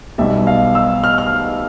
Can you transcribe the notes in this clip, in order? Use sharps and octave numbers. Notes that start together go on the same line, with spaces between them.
B1 B2 G3 E5
F5
E6
F6
F6